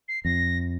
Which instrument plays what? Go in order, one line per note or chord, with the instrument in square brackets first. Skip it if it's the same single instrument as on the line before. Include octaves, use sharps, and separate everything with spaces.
[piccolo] C7
[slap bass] F2 [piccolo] A#6